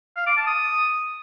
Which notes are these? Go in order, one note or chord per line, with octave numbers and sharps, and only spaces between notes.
F5
D6
A5
D#6